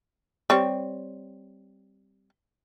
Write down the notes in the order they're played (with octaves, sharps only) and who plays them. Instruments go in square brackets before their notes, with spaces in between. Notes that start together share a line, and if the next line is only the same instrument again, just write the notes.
[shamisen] G3 C4 C#5